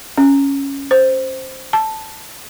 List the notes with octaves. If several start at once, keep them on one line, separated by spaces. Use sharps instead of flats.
C#4
C5
A5